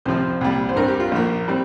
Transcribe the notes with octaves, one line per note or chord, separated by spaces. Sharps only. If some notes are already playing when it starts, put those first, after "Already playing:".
C2 C3 F3 C4 C5
C2 A#2 G3
C5
G2 G3 C4 A#4
G4
F4
A#1 A#2 A#3
G3 C4